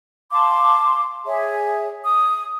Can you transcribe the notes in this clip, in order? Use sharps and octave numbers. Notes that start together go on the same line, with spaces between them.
F5 A5 C6 D6
G#4 C#5 E5
D#6